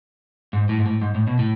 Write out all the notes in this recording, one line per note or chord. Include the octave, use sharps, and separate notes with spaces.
G#2
A2
G#2
A2
G#2
A2
B2
A2